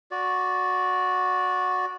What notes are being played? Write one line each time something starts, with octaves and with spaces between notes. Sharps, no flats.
F#4 D5